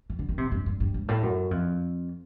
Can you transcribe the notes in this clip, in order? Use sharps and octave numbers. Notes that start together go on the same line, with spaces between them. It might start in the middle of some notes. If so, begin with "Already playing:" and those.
E3
D3
D#3
C3
G2
G2
G2
G#2
A2
F#2
F2